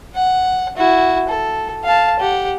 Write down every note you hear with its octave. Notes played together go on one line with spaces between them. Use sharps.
F#5
E4 F#4
A4
F5 A5
G4 F#5